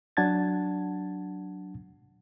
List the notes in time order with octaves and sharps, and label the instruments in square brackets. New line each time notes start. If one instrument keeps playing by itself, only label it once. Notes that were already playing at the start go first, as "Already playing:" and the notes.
[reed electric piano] F#3 D4 F#5 A5 G#6 A6